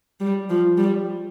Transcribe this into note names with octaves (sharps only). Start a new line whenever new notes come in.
G3
F3
G3